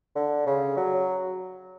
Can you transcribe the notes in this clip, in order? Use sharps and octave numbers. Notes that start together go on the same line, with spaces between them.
D3
C#3
F#3